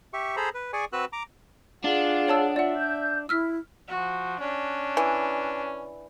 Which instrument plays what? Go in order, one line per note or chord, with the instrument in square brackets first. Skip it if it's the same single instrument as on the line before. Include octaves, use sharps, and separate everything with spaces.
[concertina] G4 E5 C#6
G#4 A4 C5 A#5 B5
B4
G#4 D5 G#5 C#6
C4 F#4 B4 E6 F#6
A#5 D6
[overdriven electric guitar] D4 [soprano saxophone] F4 [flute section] G#4 F#5
[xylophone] C#5 A5 E6
[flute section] F4 [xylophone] D5 F#5 [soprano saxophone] E5
[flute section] G6
[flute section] E4 [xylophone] E6 F6 B6
[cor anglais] F3 [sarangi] F#4
[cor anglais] C#4 [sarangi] D4
[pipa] E3